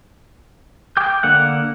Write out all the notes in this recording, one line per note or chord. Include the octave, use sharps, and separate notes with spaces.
G5 D6 D#6 G6
D3 A#3 F#5 F#6